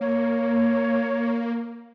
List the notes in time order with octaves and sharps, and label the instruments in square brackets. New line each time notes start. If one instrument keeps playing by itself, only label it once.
[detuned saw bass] A#3 [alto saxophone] C#5